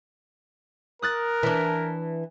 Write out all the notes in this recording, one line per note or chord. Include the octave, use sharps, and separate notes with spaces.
A#4 D#6 F#6 A6
E3 D4